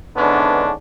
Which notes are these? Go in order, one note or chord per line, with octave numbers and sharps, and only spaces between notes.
G#2 D3 E3 B3 C#4 D4